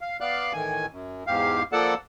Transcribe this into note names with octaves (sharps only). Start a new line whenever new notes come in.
F5
B3 D5 F5 F#6
A2 D#3 E3 G#5
F#2
E2 G#2 G4 F5
F3 A#3 A4 D5 F#5 A5